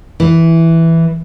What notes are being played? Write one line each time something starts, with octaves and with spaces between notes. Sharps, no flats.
E3